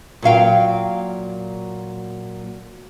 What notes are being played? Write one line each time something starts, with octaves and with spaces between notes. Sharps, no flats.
A#2 F#3 F5 G5